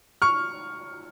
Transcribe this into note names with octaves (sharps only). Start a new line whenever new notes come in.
C#6 F6